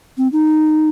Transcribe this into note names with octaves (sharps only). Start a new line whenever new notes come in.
C4
D#4